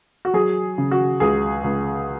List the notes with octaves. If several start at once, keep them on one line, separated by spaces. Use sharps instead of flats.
F#4
F#3 G#4
C#3
F#4
C#2 G#4
C#2